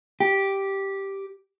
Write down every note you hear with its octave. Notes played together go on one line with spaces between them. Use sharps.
G4